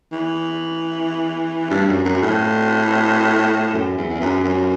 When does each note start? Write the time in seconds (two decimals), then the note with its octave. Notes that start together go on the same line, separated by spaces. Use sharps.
0.12 E3
1.70 G2
1.88 F#2
2.05 F#2
2.22 A2
3.74 F#2
3.97 E2
4.09 E2
4.21 F#2
4.43 F#2